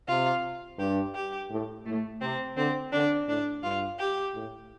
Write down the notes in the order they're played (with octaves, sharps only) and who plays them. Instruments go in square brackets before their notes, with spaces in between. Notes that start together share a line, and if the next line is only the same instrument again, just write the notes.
[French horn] C3 [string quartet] F4
[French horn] G2 [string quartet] G4
[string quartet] G4
[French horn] A2
[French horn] A2 [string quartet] A3
[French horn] C3 [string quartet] C4
[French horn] D3 [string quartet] C4
[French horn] D3 [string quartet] D4
[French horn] A2 [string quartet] D4
[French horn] G2 [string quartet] F4
[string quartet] G4
[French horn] A2